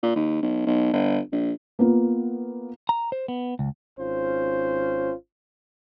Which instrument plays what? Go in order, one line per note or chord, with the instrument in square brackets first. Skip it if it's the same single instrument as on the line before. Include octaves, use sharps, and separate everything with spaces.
[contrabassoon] A#2
D#2
B1
B1
G1
A#1
[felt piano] A#3 B3 F4
[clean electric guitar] A#5
C5
B3
C#2
[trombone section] G#1 C#4 F4 C5